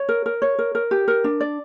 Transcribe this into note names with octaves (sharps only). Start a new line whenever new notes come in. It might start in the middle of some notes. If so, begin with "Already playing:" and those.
Already playing: C#5
A#4
A#4
C#5
A#4
A#4
G4
A#4
D4
D5